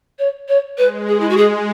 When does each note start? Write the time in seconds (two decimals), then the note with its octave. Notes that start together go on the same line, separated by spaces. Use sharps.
0.19 C#5
0.48 C#5
0.78 G#3 B4
1.08 G#4
1.20 E4
1.29 F#4
1.37 G#4